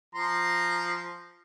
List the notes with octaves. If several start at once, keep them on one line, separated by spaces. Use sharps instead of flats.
F3 A#5 C6